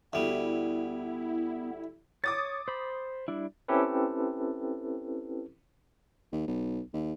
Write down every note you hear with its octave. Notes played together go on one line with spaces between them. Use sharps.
D2 G3 B3 E4
C#5 D6 D#6 A6
C5 B5
G3 D4 E4
C4 C#4 E4 G4 A4 B4
D#2
B1
D#2